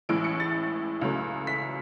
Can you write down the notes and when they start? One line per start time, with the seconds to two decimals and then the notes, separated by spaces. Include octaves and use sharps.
0.09 A1 A2 E3 G#3 D7
0.24 C#7
0.40 A6
1.01 C#2 C#3 F#3 A3
1.47 B6